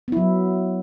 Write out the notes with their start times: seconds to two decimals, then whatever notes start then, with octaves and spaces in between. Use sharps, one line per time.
0.08 B3
0.12 E4
0.17 F#3